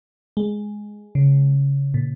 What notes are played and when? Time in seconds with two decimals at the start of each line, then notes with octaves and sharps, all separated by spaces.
0.37 G#3
1.15 C#3
1.94 A#2